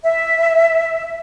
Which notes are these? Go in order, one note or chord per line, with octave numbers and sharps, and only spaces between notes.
E5